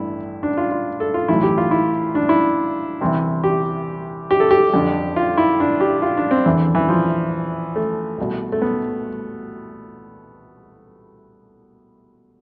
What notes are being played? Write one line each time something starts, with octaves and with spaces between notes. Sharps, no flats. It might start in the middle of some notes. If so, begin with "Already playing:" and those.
Already playing: A1 G2 D3 E4
D4
F4
F4
A4
F4
B1 A2 E3 E4
G4
F4
E4
D4
E4
C2 C3 E3
G4
G4
A4
G4
F2 D3
F4
E4
D4
G4
F4
D4
C4
E2 D3 E3
E3
F3
A3
C2 B2
A3
B3